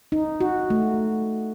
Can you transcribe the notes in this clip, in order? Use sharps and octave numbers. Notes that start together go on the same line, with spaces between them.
D#4
F#4
A3